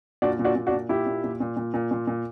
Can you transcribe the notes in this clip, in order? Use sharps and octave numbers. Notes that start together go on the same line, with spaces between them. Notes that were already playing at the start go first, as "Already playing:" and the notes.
A#2 D4 F#4
A#2
D4 F#4
A#2
D4 F#4
A#2
A#2 E4 G4
A#2
A#2
A#2
A#2
A#2
A#2
A#2